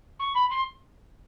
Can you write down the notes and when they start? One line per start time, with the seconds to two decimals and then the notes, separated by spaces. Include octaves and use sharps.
0.19 C#6
0.34 B5
0.50 C6